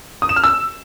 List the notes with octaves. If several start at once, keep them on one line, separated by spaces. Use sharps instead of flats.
D#6
E7
F6
E6